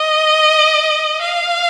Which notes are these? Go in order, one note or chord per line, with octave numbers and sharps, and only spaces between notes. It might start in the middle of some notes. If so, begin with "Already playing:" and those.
Already playing: D#5
F5